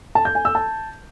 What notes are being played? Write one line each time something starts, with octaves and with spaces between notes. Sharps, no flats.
A5
G6
G#5
E6
A5